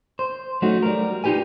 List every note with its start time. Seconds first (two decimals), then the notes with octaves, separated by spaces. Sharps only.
0.19 C5
0.62 F#3 A3 C#4 D#4 F#4
0.83 G3 A#4
1.24 D#4 F4 G4 B4 G#5